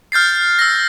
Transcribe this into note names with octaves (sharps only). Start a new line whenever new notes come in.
F6 G6 A6 C7
E6 A#6